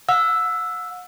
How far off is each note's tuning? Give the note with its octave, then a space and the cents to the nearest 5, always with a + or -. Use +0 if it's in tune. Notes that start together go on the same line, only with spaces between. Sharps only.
F#5 -45 E6 +0